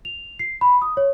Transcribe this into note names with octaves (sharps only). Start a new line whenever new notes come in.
F7
C7
B5
D#6
C#5